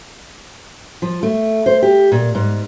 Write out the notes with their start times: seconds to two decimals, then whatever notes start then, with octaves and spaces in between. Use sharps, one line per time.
1.02 F3
1.23 A3
1.66 C5
1.82 G4
2.12 A#2
2.35 G#2